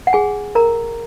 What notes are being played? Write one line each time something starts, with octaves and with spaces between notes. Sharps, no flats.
F#5
G#4 G#5
A#4 A#5